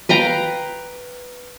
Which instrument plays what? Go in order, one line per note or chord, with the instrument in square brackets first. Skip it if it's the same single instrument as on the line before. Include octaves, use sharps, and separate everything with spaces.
[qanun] B4 F5 G5 A#5